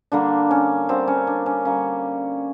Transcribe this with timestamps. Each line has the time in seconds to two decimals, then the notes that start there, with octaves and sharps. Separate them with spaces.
0.12 D3 G3 A#3 D4
0.51 C#4
0.89 D3 G3 A#3 C4
1.08 C#4
1.27 D4
1.46 C#4
1.65 D3 G3 A#3 C#4